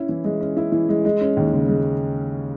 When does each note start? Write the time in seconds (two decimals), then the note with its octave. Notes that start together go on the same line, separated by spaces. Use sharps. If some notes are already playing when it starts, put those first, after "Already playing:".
Already playing: C#4 E4
0.09 E3
0.24 G#3
0.41 C#4
0.57 E4
0.72 E3
0.89 G#3
1.05 G#3
1.21 C#4
1.37 D#2
1.54 C#3
1.69 G#3